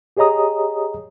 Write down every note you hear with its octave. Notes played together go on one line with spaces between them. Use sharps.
G4 G#4 C#5 D#5 A#5 D#6